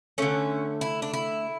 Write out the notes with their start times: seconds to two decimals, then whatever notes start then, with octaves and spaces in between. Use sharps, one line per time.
0.18 D3 A3 C#4
0.81 E4
1.02 D4
1.13 E4